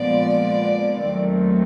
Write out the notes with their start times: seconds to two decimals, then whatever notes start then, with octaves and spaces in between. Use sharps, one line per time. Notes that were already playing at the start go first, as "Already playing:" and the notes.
Already playing: A#2 F3 G#3 B3 D5
1.01 D#2 D#3 F#3 A3 C4